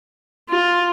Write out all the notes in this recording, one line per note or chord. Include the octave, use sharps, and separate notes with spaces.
F4